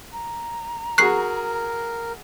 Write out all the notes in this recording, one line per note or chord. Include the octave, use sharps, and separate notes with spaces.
A#5
F#4 G#4 A#4 C#6 F#6 C7